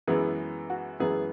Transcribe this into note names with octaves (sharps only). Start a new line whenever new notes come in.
F#2 E3 G#3 B3 G#4
F#4
F#2 E3 G#3 B3 G#4